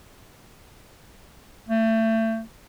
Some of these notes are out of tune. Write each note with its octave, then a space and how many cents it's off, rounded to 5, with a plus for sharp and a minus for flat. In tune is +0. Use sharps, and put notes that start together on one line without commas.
A3 +30